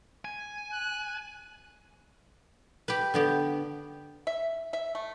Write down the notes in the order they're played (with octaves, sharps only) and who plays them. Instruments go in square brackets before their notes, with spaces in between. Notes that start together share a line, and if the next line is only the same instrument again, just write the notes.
[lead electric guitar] G#5
[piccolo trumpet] F#6
[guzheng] G4 B4
D3 B3 G4
[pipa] E5
E5
A3